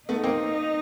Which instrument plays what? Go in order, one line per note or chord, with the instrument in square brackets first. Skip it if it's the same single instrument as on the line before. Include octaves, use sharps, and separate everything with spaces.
[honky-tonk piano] A3 B3 [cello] D#4
[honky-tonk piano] A#3 C4